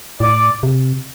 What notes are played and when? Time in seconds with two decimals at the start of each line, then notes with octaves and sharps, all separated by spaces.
0.20 A2 D5
0.63 C3